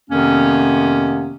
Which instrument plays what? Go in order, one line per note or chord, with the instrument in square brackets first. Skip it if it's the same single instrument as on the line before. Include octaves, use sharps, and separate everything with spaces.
[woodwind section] F2 C3 D#3 A#3 B3 C#4